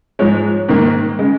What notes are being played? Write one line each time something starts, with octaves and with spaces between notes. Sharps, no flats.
G#2 F3 G#3 C#5
G#2 D#3 A#3
C#3 G#3